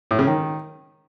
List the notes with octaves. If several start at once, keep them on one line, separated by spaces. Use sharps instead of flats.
A2
C#3
D#3